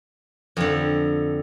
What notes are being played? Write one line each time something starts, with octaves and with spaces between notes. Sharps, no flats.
F2 D3